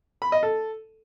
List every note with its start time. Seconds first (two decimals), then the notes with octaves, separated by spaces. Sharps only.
0.22 B5
0.32 D#5
0.43 A4